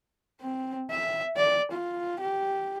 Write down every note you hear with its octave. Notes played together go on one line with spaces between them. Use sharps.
C4
E5
D5
F4
G4